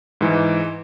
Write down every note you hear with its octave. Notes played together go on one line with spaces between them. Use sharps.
G#2 E3